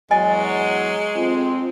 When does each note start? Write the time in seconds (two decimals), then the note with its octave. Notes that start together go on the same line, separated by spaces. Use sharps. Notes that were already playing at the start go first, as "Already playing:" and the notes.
0.11 E2 F#3 G#3 D#5 G#5
1.16 F2 F3 C4 F4